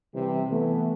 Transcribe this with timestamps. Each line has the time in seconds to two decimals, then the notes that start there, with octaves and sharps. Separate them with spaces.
0.14 C3 E3 G3
0.51 E3 A3 B3